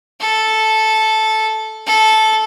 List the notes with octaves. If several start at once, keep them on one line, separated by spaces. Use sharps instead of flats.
A4
A4